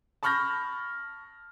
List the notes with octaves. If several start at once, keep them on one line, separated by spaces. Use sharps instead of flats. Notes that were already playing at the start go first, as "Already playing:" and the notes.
A5 B5 C#6 F6 G6 A#6